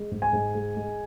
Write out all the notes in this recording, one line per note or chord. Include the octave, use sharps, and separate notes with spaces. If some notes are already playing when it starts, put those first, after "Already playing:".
Already playing: G#3
G#2
G#5
G#2
G#3
G#3